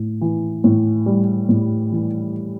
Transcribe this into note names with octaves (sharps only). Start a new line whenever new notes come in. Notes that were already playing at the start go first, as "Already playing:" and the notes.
Already playing: A2
E3
A2
G3
A2
E3